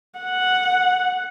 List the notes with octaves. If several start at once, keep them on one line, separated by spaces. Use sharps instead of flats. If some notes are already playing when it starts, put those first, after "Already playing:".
F#5